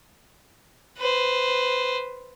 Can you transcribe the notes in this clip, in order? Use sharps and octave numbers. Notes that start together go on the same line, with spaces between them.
B4 C5